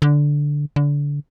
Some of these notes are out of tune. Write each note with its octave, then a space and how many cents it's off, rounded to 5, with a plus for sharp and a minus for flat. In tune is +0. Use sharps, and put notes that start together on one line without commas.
D3 -5
D3 -25